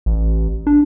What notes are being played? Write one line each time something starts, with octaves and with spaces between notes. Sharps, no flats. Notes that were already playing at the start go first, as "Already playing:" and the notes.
A1
D4